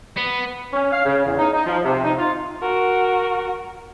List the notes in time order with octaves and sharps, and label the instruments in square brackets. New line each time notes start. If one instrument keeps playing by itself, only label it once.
[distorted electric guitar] B3
[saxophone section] C#4
F5
C#3
E2
D#4
D#4
F3
C3
D#4
F4
[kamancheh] F#4 A#4